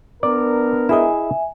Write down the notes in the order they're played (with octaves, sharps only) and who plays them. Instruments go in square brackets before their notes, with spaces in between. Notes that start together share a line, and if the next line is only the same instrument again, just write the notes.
[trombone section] B3 D4 A#4 [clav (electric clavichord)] D5
[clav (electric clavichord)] E4 G#4 D#5 [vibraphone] E5 G#5